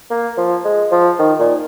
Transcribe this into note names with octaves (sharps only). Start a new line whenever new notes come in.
A#3
F3
G#3
F3
D#3
A#2